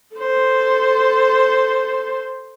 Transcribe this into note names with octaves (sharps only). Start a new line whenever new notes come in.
A4 C5